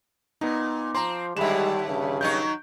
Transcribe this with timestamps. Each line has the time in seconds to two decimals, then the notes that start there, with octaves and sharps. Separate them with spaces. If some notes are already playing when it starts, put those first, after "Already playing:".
0.41 A#2 B3 D#4
0.95 F3 C4 A#5 C6
1.37 D#2 D3 G3 G#3 E5 B5 E7
1.88 G2 C#3
2.21 D#3 F#3 D#4 C#6 G6